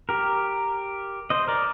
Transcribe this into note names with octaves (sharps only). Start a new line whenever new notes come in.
G4 A#4
C5 D#5
A#4 D5